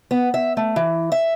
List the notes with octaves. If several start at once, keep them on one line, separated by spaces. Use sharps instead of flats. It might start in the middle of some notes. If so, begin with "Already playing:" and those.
B3
E5
A3
E3
E5